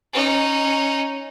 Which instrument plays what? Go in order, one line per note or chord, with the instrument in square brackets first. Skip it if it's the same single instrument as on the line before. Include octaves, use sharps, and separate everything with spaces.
[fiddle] C#4 D#4